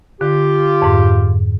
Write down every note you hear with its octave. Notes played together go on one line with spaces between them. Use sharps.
D3 F4 G4
F2 G#2